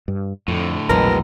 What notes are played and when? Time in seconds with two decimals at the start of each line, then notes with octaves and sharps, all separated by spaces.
0.08 G2
0.48 F2 A2 D3
0.89 A#1 E2 B2 F#3 G#3 B3 A#4